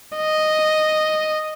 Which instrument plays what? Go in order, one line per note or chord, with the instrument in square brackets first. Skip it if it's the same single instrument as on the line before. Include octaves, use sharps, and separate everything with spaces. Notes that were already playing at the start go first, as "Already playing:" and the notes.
[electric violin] D#5